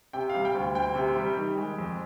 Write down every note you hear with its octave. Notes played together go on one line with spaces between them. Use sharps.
C3 G5
F5
G3
G5
D2
D2 G5
C3
G3
D#3
G#3
F2